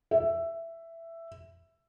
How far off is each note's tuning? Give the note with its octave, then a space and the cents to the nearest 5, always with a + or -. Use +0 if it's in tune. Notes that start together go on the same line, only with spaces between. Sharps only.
E5 +10